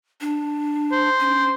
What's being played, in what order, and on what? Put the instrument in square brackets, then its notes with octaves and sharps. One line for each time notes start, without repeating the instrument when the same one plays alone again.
[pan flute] D4
[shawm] C5
[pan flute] C#4